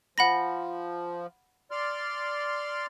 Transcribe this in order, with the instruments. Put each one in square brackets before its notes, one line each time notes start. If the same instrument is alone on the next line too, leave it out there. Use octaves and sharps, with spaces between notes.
[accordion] F3 [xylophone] F#5 B5 A#6
[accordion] D5 C6 F6